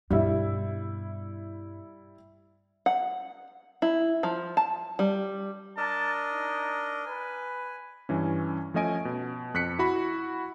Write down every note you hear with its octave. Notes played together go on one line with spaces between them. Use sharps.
G2 B2 G3 E4
F#5
E4
F3
A5
G3
D4 A#4 D#5 A5
D#4
B4 G#5
G2 E3 C#4
F3 A3 C#4 D#5 G#5 D7
B2
F2 F#6 B6 C#7
E4 F#4 B5